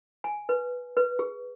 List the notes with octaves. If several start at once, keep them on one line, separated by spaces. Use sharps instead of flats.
G#5
B4
B4
G#4